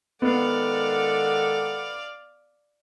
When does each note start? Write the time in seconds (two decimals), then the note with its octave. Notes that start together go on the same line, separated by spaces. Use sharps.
0.22 D#3 G#3 B3 A4 D5 F5 F#5